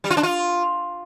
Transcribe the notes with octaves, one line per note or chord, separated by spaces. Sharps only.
G3
F4
D4
F4